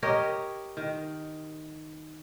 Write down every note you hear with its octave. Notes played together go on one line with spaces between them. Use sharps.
G4 A#4 C#5 D#5
D#3